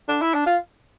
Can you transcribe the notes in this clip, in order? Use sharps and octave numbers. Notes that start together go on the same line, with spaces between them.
D4
E4
D4
F4